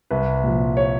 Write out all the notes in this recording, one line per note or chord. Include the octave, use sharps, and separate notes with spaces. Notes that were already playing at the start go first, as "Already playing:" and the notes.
C2 B4
A#2 F3
C#5